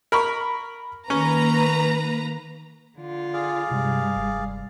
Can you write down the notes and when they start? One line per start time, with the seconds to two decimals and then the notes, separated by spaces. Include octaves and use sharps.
0.12 A#4 B5 C#6
1.10 D#3 A#3 C#4 B4 A#5
2.98 D3 F4
3.33 G#4 D5 F5
3.71 G2 C3 G#3
4.16 F1